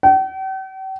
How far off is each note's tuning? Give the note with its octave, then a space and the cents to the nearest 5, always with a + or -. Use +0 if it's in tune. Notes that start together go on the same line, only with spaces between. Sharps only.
G5 -45